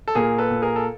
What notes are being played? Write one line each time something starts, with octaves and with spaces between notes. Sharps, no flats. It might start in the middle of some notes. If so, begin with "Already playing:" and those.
A4
A#2 G#4 A#4
A4 B4
A#2
G#4 A#4
A4